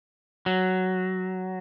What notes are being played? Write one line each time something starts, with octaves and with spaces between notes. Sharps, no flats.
F#3